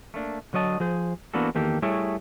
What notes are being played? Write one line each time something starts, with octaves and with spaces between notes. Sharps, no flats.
A3 A#3 D4
D3 F#3 C#5 D#5 A5
F3 G#4 C5
E3 A#3 B3 D4 F#4 A4
E2 D#3 A#3 G4 A4
G3 A3 E4 G#4 A4 C#5